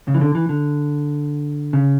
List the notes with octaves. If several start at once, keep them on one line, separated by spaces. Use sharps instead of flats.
C#3
E3
D3
E3
D3
C#3